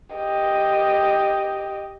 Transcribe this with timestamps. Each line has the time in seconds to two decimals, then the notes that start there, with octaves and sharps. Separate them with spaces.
0.16 G4 D#5